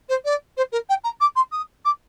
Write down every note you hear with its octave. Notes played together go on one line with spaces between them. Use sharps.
C5
D5
C5
A#4
G5
A#5
D6
C6
D#6
D6